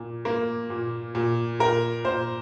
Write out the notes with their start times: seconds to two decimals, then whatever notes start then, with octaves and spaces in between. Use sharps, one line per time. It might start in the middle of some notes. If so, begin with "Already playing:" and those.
Already playing: A#2
0.25 A#3
0.70 A#2
1.15 A#2
1.60 A#2 A#4
2.05 A#2 C5